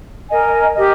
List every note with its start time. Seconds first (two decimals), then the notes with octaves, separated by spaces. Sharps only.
0.29 A#4 D#5 G#5
0.74 G4 A#4 D#5